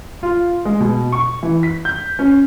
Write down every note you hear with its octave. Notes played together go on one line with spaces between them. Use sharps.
F4
G#3
B2
C#6
E3
B6
G6
C#4